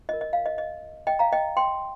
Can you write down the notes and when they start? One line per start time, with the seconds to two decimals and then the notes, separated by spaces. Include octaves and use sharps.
0.09 F4 D#5
0.13 A#4
0.21 D#5
0.33 F5
0.46 D#5
0.58 D#5
1.07 D#5 G5
1.19 F5 A#5
1.32 D#5 G5
1.57 G5 C6